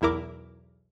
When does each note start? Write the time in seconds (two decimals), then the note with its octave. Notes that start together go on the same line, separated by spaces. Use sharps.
0.01 B1 E2 E4 A#4 D6